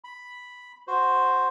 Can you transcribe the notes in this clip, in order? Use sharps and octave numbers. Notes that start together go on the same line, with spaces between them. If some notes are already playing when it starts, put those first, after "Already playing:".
B5
F#4 C5